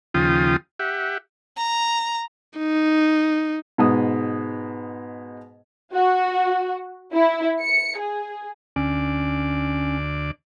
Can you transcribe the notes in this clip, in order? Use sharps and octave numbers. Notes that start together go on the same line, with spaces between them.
D#2 C#3 F3 F4 G5 D#6
G4 E5 F#5
A#5
D#4
G#2 B2 D#6
F#4
E4
C#7
G#4
D2 C#4 D5